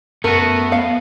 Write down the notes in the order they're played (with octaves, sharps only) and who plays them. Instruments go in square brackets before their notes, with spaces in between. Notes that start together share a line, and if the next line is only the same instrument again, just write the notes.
[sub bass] F#2 [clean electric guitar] A3 F#4 [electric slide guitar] B3 [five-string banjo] A#4
[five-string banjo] F5